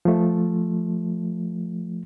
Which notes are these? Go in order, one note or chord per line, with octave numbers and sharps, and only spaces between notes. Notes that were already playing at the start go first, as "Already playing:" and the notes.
F3 A3